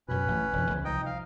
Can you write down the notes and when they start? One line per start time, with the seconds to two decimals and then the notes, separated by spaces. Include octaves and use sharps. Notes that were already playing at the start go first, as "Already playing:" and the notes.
0.08 F#2 B2 C#4 B4
0.28 A1
0.53 E1 F2
0.71 C#2 D#3 F3
0.85 C2 F3 D#4 D#5 G5
1.06 F5